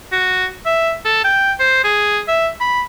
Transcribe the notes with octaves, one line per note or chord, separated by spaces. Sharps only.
F#4
E5
A4
G5
C5
G#4
E5
B5